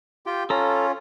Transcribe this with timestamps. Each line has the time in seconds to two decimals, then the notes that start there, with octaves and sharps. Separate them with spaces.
0.26 F4 G4 G5
0.50 C#4 F4 A4 A#5